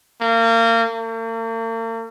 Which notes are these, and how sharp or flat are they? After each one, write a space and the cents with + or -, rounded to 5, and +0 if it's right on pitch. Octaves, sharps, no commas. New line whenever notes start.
A#3 -30
A#3 -45